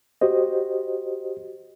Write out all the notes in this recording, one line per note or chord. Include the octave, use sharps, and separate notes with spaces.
F#4 G4 C5 D#5